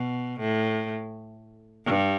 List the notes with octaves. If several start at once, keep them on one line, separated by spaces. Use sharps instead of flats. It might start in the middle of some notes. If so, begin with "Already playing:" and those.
Already playing: B2
A2
G2